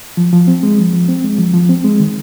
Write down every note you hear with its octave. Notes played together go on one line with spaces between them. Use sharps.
F3
F3
C4
G#3
F3
F3
C4
G#3
F3
F3
C4
G#3
D#3